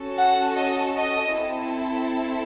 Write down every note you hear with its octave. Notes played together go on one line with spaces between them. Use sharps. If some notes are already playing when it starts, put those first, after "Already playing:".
Already playing: C#4 F#4 A4
F#5
D#5
D#5
C4 E4 A4